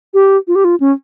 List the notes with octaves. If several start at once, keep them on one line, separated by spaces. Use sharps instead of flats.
G4
F4
G4
F4
C#4